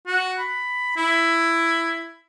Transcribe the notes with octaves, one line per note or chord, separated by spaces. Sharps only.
F#4
B5
E4